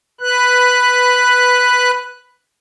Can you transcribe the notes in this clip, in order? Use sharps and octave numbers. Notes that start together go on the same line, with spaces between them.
B4 F#6